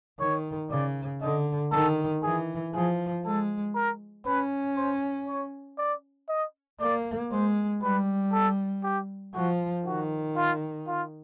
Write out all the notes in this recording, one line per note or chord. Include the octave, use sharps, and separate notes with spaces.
D#3 C#5
C#3 D5
D3 D#5
D#3 A4
E3 G#4
F3 G#4
G#3 A4
A#4
C#4 B4
C5
C#5
D5
D#5
A#3 D5
G#3 C5
G3 B4
A4
G4
F3 F#4
D#3 F#4
F4
F4